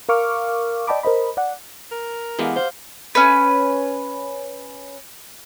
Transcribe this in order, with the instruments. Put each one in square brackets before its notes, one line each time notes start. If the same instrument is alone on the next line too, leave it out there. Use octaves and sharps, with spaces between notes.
[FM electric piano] A#4 F5 C#6 D6 F6
D5 D#5 G5 A5 B5 D6
A#4 C5 D#5 B5
D5 F#5
[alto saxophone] A#4
[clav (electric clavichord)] E3 G#3 B3 [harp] G4 F5 F#5
[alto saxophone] C5 [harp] F5
[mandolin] C#4 B4